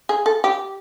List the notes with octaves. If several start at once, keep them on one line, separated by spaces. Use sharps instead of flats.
G#4
A4
G4